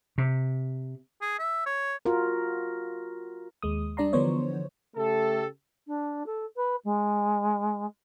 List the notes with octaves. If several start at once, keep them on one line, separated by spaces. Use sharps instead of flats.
C3
G#4
E5
C#5
F4 F#4 A#4
D#2 G#3 D#6
G3 D4 D5 A#5 C6
D3 E3 F3 B3 C5 C#5
C#3 A3 G4 A4
D4
A4
B4
G#3